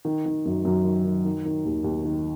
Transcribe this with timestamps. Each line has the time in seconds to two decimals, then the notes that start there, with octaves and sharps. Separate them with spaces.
0.05 D#3
0.26 D#3
0.46 F#2
0.65 F#2
0.85 D#3
1.05 D#3
1.25 D#3
1.45 D#3
1.65 D#2
1.84 D#2
2.05 D#3